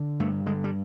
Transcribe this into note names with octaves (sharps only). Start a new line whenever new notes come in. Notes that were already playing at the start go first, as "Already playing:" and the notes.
Already playing: D3
G2 A3
D3 G#3
G3